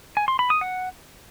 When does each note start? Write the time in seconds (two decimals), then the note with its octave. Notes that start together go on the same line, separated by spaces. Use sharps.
0.17 G#5
0.28 C6
0.39 B5
0.50 D#6
0.61 F#5